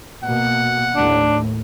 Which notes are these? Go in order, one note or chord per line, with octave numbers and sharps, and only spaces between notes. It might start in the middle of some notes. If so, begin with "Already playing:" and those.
B2 A#3 F#5
D#2 A2 D4